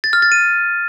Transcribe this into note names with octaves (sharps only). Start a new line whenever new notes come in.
A6
F6
A6
D#7